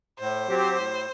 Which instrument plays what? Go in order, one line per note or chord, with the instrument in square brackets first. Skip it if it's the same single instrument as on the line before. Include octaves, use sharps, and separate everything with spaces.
[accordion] A2 [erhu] C5
[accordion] F#3 C4 G4
A2